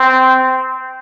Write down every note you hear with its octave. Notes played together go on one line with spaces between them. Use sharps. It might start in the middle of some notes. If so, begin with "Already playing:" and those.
Already playing: C4